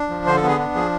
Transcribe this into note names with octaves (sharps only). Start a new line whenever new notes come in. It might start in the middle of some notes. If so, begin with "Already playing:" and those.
Already playing: D4
F3
D3 C5
A4
B3 G#4
D4
F3 G#4